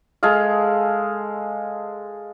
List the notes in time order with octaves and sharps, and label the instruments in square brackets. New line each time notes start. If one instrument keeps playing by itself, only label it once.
[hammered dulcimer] G#3 G#4 A4 F5